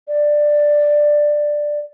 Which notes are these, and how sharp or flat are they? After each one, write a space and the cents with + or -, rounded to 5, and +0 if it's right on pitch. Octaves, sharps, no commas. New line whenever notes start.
D5 +10